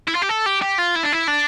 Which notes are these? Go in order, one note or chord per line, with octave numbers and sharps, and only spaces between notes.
E4
F4
G4
A4
G4
G4
F4
E4
D4
E4
D4